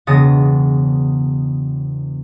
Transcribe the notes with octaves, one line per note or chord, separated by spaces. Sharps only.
E1 C#3 B3 D#6 A6 A#6